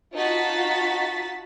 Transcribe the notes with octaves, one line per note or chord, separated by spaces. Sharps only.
D#4 F4 F#4 A5 A6 B6